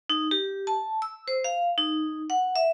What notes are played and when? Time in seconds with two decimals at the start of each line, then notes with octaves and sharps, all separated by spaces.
0.10 D#4
0.31 G4
0.67 A5
1.02 E6
1.28 C5
1.44 F5
1.78 D#4
2.30 F#5
2.56 E5